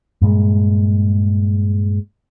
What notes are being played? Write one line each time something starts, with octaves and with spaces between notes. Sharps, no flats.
G2 A#2 G#3